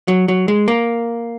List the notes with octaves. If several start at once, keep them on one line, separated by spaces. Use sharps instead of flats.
F#3
F#3
G#3
A#3